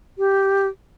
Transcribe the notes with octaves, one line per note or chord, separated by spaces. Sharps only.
G4